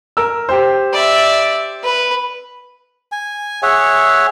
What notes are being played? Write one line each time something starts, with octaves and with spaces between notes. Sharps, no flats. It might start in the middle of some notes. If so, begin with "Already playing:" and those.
A#4 E6
G4 C5
D5 E5
B4
G#5
G#4 C#5 E5 F#5